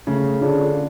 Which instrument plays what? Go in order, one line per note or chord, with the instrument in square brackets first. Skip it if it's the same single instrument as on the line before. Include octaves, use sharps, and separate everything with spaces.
[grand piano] C#3 [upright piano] A3
[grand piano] D3 [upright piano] C#4 F4 G#4